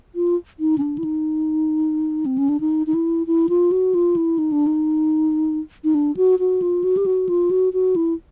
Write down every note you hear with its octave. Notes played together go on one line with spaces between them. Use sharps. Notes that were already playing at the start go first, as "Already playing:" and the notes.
F4
D#4
C#4
D4
E4
D#4
C4
C#4
D4
D#4
D#4
E4
E4
F4
F#4
F4
E4
D#4
D4
D#4
D#4
D4
F#4
F#4
F4
F#4
G4
F#4
F4
F#4
F#4
E4